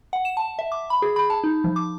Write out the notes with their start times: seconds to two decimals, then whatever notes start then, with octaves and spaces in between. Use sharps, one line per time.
0.13 F#5
0.25 E7
0.37 A5
0.59 E5
0.72 D6
0.90 B5
1.02 G#4
1.16 B5
1.30 A5
1.44 D#4
1.64 F3
1.76 D6